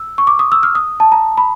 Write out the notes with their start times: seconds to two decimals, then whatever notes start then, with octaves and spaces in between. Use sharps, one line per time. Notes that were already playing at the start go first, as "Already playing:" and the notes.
Already playing: E6
0.18 C#6
0.27 D6
0.39 D#6
0.52 E6
0.63 F6
0.75 D#6
1.00 A5
1.12 A#5
1.38 B5